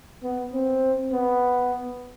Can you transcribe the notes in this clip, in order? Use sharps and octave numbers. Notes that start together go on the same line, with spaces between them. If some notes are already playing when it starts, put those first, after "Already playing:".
B3
C4
B3